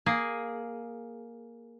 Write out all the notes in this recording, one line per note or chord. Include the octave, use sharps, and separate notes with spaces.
A#3 G#4